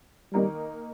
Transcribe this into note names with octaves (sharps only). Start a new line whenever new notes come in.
D#3 G3 A#3 D#4 A#4